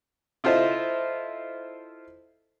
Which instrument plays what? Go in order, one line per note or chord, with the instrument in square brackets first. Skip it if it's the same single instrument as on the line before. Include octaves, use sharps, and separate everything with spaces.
[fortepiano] E4 F4 A4 C5 D#5 E5